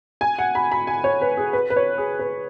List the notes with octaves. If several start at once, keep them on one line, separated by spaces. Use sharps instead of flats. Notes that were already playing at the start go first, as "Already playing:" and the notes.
G#5
F#5
B5
B5
G#5
C#5
B4
G#4
B4
B4
C#5
G#4
B4